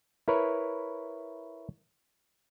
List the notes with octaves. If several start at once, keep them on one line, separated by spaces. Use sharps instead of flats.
E4 A#4 B4 C#5